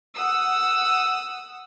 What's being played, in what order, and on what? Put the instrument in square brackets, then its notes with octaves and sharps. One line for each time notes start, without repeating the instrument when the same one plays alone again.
[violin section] F#5 D#6 E6